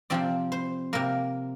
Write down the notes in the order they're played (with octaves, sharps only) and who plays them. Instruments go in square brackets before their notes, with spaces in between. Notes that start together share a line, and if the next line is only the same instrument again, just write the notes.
[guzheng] C3 F3 C4 D5
C5
C3 A#3 A#4